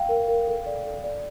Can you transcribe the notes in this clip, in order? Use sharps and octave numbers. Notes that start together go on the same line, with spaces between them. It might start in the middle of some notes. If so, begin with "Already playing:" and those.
Already playing: F5 G5
A#4
A#4
A4
D5
A4
D5